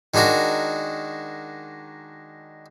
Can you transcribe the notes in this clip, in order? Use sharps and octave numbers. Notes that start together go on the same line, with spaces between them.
D#3 G#3 D4 F#4 A#4